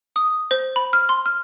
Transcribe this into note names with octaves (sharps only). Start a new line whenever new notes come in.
D#6
C5
B5
F6
C6
F6